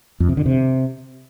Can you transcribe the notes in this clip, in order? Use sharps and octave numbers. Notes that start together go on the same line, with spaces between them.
F2
C3
D3
C3